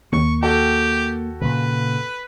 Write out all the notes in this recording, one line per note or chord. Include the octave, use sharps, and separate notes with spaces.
D#2 A#3 C#6
F#4 G4 A4 G5
A#2 C#3 B4